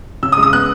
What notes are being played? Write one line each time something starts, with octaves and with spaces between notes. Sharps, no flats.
C#3 E6
D#6
G#3
D#6
B3 F#6